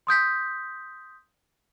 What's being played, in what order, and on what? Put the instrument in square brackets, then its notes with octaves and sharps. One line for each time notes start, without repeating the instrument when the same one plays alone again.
[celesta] C6 D#6 G6 B6